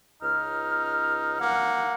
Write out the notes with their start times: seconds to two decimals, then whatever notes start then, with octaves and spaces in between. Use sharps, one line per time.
0.23 C#2 D#4 F6
1.41 A#3 F#5